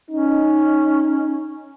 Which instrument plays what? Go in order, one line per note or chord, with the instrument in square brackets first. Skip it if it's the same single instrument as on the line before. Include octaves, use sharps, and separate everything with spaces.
[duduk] C#4 [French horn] D#4